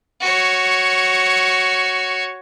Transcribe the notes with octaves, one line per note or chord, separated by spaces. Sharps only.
F#4 C#5